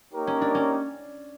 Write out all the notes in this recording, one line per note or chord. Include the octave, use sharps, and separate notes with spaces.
A#3 D#4 G4 A#4 C#5
C#4
D4
C#4